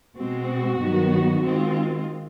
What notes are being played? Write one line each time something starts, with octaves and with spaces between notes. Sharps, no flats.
B2 G#3 C4 F#4
G2 D#3 F#3 B3
D#3 G#3 C4 F4